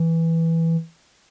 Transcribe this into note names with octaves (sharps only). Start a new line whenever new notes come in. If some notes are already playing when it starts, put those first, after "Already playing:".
Already playing: E3